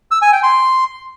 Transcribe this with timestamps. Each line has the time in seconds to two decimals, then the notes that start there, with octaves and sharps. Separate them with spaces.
0.11 E6
0.22 G#5
0.33 G5
0.43 C6